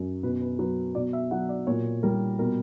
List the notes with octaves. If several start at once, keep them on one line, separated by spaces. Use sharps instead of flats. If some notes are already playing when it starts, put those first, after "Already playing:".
Already playing: F#2 F#3
B2 B4
B4
F#3 B4
B2 D5
E5
F#3 F#5
D5
A#2 C#5
G3 A#4
B2 A#4